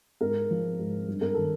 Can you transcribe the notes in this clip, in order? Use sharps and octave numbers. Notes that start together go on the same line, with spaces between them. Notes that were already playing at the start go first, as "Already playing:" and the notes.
G#2 A#4
F3
G#2
G2
A#4
D#3 A4